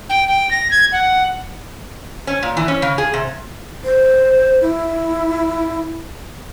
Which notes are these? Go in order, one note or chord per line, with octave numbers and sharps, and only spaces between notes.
G5
G5
A#6
G#6
F#5
C#4
A#2
E3
C#4
C#3
G#4
C3
C5
E4